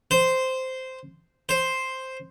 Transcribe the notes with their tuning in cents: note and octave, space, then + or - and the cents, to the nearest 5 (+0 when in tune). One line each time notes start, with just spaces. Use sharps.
C5 -10
C5 +0